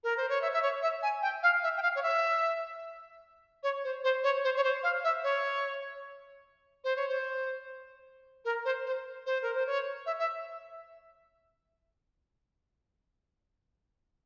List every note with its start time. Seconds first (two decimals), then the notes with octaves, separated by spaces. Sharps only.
0.04 A#4
0.17 C5
0.29 C#5
0.42 E5
0.53 E5
0.62 C#5
0.82 E5
1.03 G#5
1.22 G5
1.43 F5
1.63 E5
1.77 G5
1.82 F5
1.96 C#5
2.03 E5
3.63 C#5
3.84 C5
4.04 C5
4.24 C#5
4.44 C5
4.56 C#5
4.64 C5
4.83 F5
5.04 E5
5.24 C#5
6.84 C5
6.96 C#5
7.08 C5
8.45 A#4
8.65 C5
8.86 C5
9.26 C5
9.42 A#4
9.55 C5
9.66 C#5
10.06 E5
10.19 E5